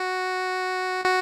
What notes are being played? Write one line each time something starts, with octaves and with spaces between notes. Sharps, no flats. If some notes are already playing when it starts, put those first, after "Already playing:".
Already playing: F#4
F#4